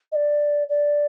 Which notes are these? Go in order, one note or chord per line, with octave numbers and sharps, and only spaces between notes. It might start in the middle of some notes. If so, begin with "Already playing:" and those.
D#5
D5
D5